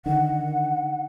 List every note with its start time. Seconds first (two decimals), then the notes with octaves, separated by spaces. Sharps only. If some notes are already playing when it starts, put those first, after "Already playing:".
0.06 D3 D#3 F#5